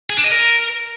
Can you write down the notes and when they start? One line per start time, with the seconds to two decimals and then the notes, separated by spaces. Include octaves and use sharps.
0.10 G#4
0.17 D4
0.24 D#5
0.32 A#4